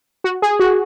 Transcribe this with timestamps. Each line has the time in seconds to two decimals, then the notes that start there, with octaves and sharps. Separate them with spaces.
0.24 F#4
0.42 G#4
0.60 F#4